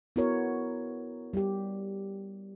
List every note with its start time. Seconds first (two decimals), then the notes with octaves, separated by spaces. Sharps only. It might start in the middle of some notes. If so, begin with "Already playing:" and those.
0.16 B3 E4 F#4 A#4 C#5
1.33 G3 G4